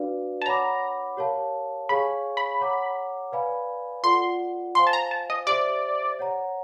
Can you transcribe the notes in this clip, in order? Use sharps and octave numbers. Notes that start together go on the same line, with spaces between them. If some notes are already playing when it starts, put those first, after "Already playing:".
Already playing: D4 F#4 B4 D5 F5
A5
C#5 F#5 A#5 B5 D6
G4 A#4 C#5 F5 A5
G#4 C#5 F5 G#5 B5 C#6
B5
C#5 F#5 A#5 D6
B4 D5 F5 G#5 B5
F4 A4 D5 F#5 C6
C5 F5 G#5 C6
A5
A#5
A5
D#5
G4 C5 D5 E5
C#5 F#5 A#5